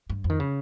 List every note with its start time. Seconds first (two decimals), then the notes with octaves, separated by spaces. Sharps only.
0.10 G2
0.24 F2
0.30 D#3
0.40 C#3